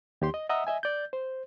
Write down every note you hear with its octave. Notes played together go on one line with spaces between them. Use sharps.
D#2 G4 C6
D#5
D#5 E5 F#5 A#5 D#6 E6
D#5 E5 G#5
D5 G6
C5